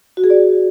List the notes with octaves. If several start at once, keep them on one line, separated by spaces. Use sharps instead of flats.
F#4
G#4
D5